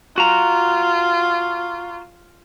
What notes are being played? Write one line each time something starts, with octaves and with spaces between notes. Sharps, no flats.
F4 F#4 A#5